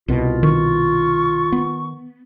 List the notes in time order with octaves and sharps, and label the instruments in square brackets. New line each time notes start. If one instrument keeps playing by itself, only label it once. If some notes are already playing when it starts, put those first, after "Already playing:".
[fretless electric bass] C2 B2 [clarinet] F4
[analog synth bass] D#3 [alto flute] C#6
[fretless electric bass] B3